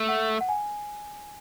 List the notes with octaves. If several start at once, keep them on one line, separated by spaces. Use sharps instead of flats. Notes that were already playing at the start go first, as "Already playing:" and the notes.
Already playing: A3
F#5
F#5
G#5